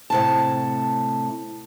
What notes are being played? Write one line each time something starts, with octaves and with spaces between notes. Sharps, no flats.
A2 C3 A5